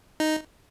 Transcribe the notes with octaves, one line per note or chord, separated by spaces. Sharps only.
D#4